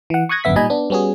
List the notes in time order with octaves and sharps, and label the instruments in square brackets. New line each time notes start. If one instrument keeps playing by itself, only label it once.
[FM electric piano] E3 F#5
C#6 D#6 F#6 G#6 A#6
G#1 F#2 D3 B3 E5 B6
A#2 G3 D#4 D#5 G#5 B5
B3 D4
G3 B3 C#4 F#4 G#4